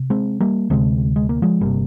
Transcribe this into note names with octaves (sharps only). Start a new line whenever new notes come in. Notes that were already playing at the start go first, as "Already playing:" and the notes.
Already playing: C3
G#3 C4
G3 A#3
D2 C3 G#3 C4
G#3
A#3
F3 G#3
G1 C3 G3 A#3